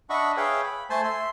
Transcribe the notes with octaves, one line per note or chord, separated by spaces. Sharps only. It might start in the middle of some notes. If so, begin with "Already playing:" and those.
D4 D#5 E5 F#5 B5 C#6
G#4 B4 C#5 E5 F5 G5
B5
A3 C5 G#5 A5 C6
E5 C6